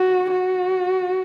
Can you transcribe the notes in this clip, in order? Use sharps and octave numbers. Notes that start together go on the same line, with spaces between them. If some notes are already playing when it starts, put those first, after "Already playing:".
Already playing: F#4
F#4